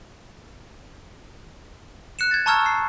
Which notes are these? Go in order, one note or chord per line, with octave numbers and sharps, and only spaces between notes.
F#6 C#7 E7
G#6 A6
A5 A#5 C#6 E6 F6 G#6
C7